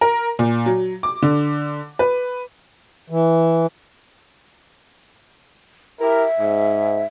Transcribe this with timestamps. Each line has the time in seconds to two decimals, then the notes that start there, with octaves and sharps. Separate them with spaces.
0.01 A#4
0.39 A#2
0.66 F#3
1.03 D6
1.22 D3
1.99 B4
3.10 E3
6.00 E4 G4 A#4 E5
6.39 G#2